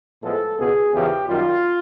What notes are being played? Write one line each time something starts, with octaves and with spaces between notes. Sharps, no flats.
A2 F3 G#3 B3 A4
C#2 B2 G#3 B3 G#4
E2 C#3 F3 G4
F#2 D#3 G3 F4